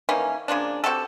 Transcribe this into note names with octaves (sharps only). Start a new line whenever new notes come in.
D#3 E3 A#3 C#4
C#3 F3 A#3 D4
C4 F#4 G4 A4